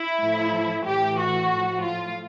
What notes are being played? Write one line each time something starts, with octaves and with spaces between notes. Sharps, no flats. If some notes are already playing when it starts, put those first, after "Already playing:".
Already playing: E4
A2 F3
A2 E3 G4
F#4
A2 F3
F4